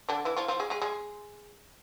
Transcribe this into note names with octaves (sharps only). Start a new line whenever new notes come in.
D3 D4
E3 E4
F3 F4
F3 F4
G#3 G#4
G#3 G#4
G#3 G#4